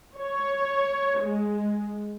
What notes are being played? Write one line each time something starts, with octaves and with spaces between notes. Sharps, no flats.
C#5
G#3